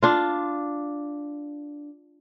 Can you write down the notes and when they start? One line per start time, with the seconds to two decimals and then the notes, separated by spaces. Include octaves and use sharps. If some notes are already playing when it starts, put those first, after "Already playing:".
0.03 D4 F4